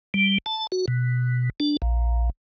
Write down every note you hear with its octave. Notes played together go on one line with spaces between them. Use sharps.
G3
A5
F#4
B2
D4
A#1